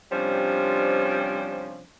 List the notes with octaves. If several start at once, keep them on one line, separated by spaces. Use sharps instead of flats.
C3 F3 G3 C#4 D4 C5